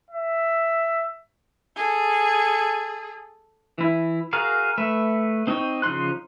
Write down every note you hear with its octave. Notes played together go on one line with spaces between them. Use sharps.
E5
G#4 A4
E3 E4
F#4 G#4 A#4 F5
A3 B4 E5
C4 D#4 D#5 G5 C#6
C#3 F3 D#4 C6 F#6